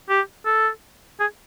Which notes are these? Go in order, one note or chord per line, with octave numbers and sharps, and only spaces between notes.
G4
A4
G#4